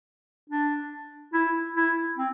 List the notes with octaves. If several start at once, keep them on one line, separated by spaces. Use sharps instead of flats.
D4
E4
E4
C4